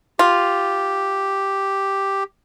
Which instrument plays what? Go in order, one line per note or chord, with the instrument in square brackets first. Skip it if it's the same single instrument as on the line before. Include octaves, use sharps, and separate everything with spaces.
[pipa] F4 [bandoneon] G4